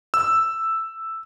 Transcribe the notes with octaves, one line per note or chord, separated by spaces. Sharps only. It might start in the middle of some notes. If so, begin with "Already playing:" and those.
E6